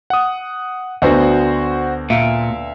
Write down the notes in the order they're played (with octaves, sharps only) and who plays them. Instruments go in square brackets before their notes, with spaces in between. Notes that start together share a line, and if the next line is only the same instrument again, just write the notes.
[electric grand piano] F#5 D#6
[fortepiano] D2 B3 [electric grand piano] F#4 C5 F#5
[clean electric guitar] A#2 [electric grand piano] E5 F5